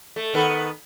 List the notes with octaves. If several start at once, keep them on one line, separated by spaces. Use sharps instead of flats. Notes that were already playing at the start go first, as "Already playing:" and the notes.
A3
D#3 B3 A4